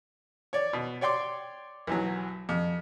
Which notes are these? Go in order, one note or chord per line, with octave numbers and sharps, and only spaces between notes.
C#5 D5
B2
C#5 D5 G5 C6 D6
B1 E3 F#3
F2